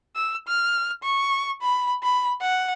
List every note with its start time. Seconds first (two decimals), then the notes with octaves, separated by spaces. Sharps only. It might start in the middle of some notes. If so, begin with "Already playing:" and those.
0.16 E6
0.48 F6
1.03 C#6
1.62 B5
2.03 B5
2.41 F#5